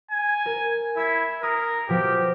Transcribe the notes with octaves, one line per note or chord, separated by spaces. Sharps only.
G#5
A#4
E4 E6 G#6 B6
A#4 D#6 C7
B2 F3 G4